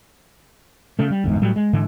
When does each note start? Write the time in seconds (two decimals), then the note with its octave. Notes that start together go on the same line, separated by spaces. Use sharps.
0.99 C#3 A3
1.10 G3
1.24 G1 E2 G#2
1.42 A2 F#3 G3
1.56 G#3
1.73 G#2 D3 E3